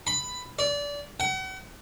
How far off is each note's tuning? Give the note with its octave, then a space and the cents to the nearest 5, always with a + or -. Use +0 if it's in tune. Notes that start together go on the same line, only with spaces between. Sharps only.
B5 +10
D5 -25
F#5 +40